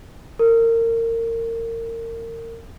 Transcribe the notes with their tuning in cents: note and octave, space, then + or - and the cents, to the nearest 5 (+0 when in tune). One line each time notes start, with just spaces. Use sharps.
A#4 -30